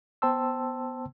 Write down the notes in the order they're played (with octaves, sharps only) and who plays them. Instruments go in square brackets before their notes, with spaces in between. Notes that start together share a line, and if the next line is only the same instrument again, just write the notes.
[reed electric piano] B3 C5 G5 A5 C6 E6